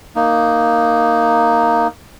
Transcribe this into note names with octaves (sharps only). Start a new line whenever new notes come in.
A#3 D#4